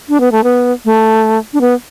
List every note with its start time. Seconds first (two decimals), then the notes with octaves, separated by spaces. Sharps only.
0.09 D4
0.20 B3
0.32 A3
0.44 B3
0.85 A3
1.53 D4
1.61 B3